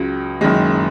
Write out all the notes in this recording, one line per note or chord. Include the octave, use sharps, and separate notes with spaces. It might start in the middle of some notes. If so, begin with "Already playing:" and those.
Already playing: C#2 C#3 F#3
F#1 F#2 D#3 G#3